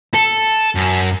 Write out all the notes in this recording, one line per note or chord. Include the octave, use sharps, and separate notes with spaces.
A4
F#2